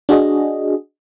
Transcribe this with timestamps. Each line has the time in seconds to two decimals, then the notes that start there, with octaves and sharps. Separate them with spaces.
0.09 D4 F#4 G#4 D#5